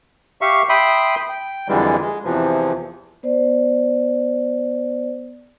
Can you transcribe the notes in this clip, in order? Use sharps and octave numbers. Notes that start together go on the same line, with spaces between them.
G4 E5 F5 C#6
E5 G5 B5 C6 D#6
G5
F2 D3 E3 G3 G#3
G#3
E2 C3 E3 F3
B3 C5 D5